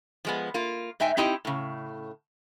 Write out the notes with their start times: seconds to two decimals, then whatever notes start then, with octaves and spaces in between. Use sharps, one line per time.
0.25 F3 G#3 B3
0.54 A#3 F4
1.00 G#2 D#4 E5 G5 G#5
1.17 C4 D#4 E4 G4 D#5
1.45 A2 C#3